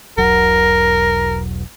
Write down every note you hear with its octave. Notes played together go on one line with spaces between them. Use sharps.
E1 B1 F#3 A#4